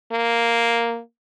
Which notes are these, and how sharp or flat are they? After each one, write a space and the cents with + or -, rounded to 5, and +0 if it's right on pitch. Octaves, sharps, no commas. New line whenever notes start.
A#3 +0